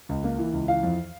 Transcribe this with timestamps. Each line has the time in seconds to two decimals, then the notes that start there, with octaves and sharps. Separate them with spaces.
0.09 C#2
0.24 A#3
0.38 E3
0.53 C#2
0.68 E3 F5
0.83 F2